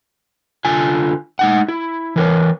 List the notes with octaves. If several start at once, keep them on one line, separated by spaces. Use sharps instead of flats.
D3 F4 G#5
G#3 D#4 F#5
E4
E3 A#4 C#5